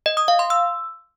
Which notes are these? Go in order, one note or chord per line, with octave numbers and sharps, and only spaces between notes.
D#5
D#6
F5
C6
E6